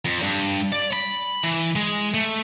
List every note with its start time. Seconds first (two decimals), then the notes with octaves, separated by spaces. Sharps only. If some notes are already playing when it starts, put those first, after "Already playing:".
0.05 F2
0.22 G2
0.72 D5
0.93 B5
1.44 E3
1.76 G#3
2.14 A3